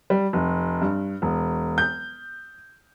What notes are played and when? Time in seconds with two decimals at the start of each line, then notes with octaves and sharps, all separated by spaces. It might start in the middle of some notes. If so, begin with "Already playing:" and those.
0.10 G3
0.33 F1
0.82 G2
1.22 E1
1.78 G6